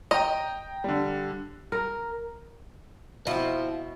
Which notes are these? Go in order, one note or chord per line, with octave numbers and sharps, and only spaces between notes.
D#5 G5 A#5
D3 G3
A#4
B2 F3 C4 E4 D#5 E5